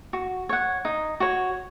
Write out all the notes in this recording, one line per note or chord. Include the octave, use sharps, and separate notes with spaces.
F#4
C#5 F#5
D#4
F#4 C#5